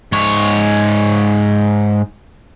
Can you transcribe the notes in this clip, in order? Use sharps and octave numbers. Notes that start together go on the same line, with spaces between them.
G#2 C#5